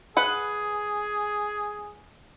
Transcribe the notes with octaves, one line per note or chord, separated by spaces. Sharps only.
G#4 B4 F#5